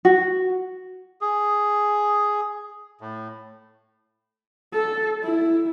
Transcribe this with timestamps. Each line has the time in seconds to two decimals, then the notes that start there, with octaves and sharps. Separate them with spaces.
0.05 F#4
1.21 G#4
3.01 A2
4.73 A4
5.23 E4